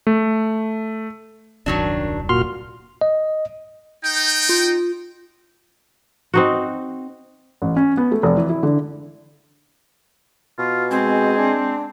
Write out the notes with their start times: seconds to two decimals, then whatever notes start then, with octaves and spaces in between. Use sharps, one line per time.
0.07 A3
1.66 D#1 C2 F#2 D#3 F#3 D4
2.29 A#2 F#4 C6 F6
3.01 D#5
4.03 D#4 G5
4.49 F4
6.34 C4 D#4 F#4
7.62 A1
7.76 C#4
7.97 B3
8.12 A3
8.23 F1
8.37 E3
8.49 E4
8.63 D3
10.59 B2 F4
10.91 G#3 C4 G#5
11.37 D4